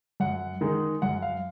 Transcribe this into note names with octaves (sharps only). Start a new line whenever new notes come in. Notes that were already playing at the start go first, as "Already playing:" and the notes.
F#2 F#5
D#3 G#3 D#4
F#2 F#5
F5